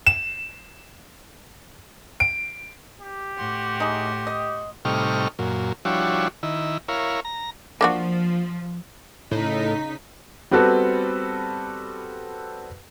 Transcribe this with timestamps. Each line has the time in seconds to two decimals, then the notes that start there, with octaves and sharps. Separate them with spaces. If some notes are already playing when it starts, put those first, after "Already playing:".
0.07 E7
2.20 D7
3.01 G4
3.38 A2 F#4 C6
3.80 D#4 G#4
4.27 D#5
4.85 A2 C3 G3 D#4 C#6 F6
5.39 F#2 A#2
5.85 F3 G3 D4 E4 F#4 C#5
6.43 D#3 E4
6.88 E4 A#4 C#5 F5
7.25 A#5
7.81 F3 A#3 D4 F#4
9.31 A2 C#3 D#4 B6
10.51 G3 B3 C4 F#4 A4 B4